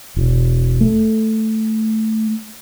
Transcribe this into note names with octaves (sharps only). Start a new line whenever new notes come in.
E1
A3